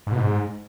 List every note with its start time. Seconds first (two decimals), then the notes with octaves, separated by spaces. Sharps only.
0.07 G#2
0.12 B2
0.18 G#2